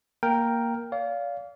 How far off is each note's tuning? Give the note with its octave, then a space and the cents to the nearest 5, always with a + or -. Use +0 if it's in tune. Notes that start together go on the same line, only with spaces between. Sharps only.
A#3 +0 A#4 +0 G5 +0
D5 -40 F5 +0